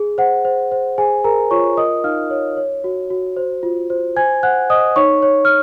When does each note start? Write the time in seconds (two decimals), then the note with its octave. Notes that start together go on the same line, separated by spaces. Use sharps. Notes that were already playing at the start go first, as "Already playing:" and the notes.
Already playing: G#4
0.18 C5 F#5
0.45 C5
0.72 C5
0.98 G#4 C5 G#5
1.24 G#4 A#4 A#5
1.50 F4 C#5 C#6
1.77 A#4 D#5 D#6
2.04 D#4 F5 F6
2.30 C#5
2.57 C#5
2.84 F#4
3.10 F#4
3.37 C5
3.63 F4
3.90 C5
4.16 C5 G#5 G#6
4.43 C5 F#5 F#6
4.70 C5 D#5 D#6
4.96 D#4 C#5 C#6
5.22 C#5
5.45 F6